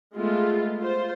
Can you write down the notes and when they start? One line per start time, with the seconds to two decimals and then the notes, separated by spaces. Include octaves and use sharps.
0.14 G#3 A3 B3 F4
0.79 F4 C5